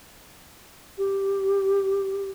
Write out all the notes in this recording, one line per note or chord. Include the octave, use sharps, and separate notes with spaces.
G4